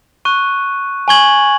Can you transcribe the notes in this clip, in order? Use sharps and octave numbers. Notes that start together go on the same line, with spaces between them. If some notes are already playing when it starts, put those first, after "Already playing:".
C#6 F#6 D#7
G#5 C#6 G#6 F#7